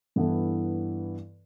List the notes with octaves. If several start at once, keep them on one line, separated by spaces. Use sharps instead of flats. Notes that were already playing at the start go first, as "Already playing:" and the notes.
G2 E3 B3 E4 A4